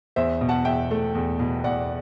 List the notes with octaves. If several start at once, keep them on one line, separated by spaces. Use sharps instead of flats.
E2 C5 E5
B2
F#5 A5
E2 E5 G5
A3
E2
B2
E2 D5 F#5